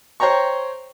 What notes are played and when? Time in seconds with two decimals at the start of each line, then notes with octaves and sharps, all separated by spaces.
0.20 C5 C#5 G5 A#5 C#6